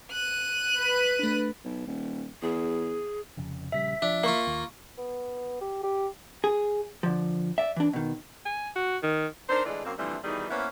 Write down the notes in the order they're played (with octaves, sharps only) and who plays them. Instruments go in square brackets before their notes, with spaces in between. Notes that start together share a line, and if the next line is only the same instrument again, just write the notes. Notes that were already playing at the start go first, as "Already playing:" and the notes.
[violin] F#6 D#7
[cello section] B4
[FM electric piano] A3 D4
[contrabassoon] B1
D#1
[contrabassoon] E2 [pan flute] G#4
[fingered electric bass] F1 F2 C#3
[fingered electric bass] A#1 C#3 G3 [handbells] E5 B6
[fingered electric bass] F3 [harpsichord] D4 [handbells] E5
[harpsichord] A#3 F4 [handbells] F5 C#6
[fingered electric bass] D#2
[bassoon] B3
G4
G4
[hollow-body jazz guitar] G#4
D3 F3
D5 E5
E3 D4
B2 D#3
[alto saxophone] G#5
F#4
D#3
[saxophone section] D4 D#4 A#4 C5
A2 E3 G#3 D4 F4
F#2 A#3 C4
D3 E3 F3 G3 A3 C4
B2 D#3 E3 G3 D#4 G#4
A#3 B3 C#4 E4 B4 C5